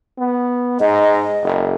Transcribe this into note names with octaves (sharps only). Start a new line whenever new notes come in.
B3
G#2 D#5
F#1